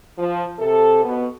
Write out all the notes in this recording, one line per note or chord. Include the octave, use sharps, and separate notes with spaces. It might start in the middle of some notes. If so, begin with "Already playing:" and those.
F3
C3 A4
B2 B3